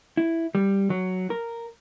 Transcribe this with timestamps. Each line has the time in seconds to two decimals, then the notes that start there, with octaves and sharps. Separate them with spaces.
0.17 E4
0.55 G3
0.90 F#3
1.30 A#4